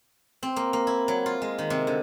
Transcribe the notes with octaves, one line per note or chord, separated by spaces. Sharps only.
C4
A#3
A#3
E4
F#3
F4
G#3
D#3
C3
D3